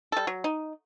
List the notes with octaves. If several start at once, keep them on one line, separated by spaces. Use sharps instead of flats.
G3 A4
F#3
D#4